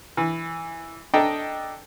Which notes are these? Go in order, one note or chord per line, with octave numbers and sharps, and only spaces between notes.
E3
D4 A4 D#5 G5 A#5